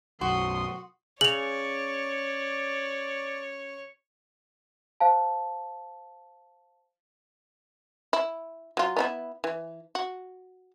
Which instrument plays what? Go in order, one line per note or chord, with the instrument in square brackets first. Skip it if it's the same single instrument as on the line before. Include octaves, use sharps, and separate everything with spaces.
[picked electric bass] B1 F#2 [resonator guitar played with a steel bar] F#4 [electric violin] C6 D#6
[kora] C#3 [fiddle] C#5 [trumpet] D5 [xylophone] F7 F#7
[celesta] C5 F5 A5
[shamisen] E4
F#3 F4
B3 D#4 E4
E3
F#4